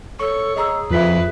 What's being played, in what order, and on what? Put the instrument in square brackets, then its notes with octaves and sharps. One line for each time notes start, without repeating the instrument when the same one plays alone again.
[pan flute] A4 [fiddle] C#5 [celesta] C#6
[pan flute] G#4 [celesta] D#5 A#5 E6
[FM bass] F2 [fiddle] E4 B4 [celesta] F4 B6